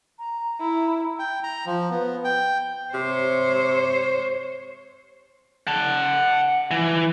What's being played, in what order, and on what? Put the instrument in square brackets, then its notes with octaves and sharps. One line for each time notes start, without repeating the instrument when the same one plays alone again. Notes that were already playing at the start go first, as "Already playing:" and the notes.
[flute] A#5
[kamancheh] E4
[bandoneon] G5
A#5
F3
B3
G5
[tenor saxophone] C3 [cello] C5 C#5
[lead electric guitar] F#5 A5
E3